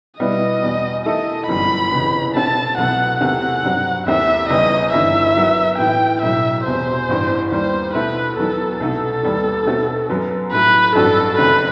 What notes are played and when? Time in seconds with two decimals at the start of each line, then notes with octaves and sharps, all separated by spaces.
0.19 B2 G3 B3 E4 D#5
0.62 E2 B2 G3
1.05 D#3 A3 E4 A4 D#5
1.48 G1 F#2 E3 G3 B5
1.91 F#1 E2 C3 E3 B3
2.35 B2 A3 C4 D#4 A5
2.78 C2 B2 F#3 A3 F#5
3.21 E2 C3 D#3 A3 C4 F#5
3.64 G2 F#3 C4
4.06 D#2 D#3 A3 C4 E4 E5
4.49 F#1 E2 D#3 G3 B3 D#5
4.93 G1 G2 E3 E5
5.36 D#3 F#3 B3 F#4
5.78 A2 E3 B3 G5
6.22 B1 A2 F#3 E5
6.65 E1 E2 C3 C5
7.09 A1 G2 E3
7.51 D#2 D#3 G3 B3 C5
7.94 B2 A3 E4 A4 B4
8.37 E2 D#3 F#3 B3 D#4 A4
8.80 C2 B2 A3 D#4 A4
9.23 D#2 D#3 G3 B3
9.66 B2 A3 C4 D#4 F#4
10.09 F#2 F#3 B3
10.52 A2 F#3 A3 D#4 B4
10.95 A1 G2 F#3 C4 F#4 A4
11.38 F#1 F#2 D#3 A3 C4 B4